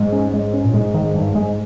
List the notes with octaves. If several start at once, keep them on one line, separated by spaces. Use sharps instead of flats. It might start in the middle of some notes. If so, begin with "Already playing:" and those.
Already playing: G#2 G#3
C#4
G#3
C#4
A#2
G#2 G#3
D#3
G2
G#3